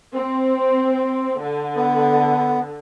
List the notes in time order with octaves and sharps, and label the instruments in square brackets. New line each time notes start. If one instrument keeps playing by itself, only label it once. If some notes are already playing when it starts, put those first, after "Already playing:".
[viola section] C4
D3
[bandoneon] B3